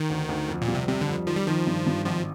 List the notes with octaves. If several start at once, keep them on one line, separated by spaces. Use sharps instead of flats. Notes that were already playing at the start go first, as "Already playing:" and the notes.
Already playing: D#3
D2
D2
F2
A#2
G3
C3
C3 G3
D3
F2
D#3 F3
G3
D#3 F3
G2
G2
G#1 F3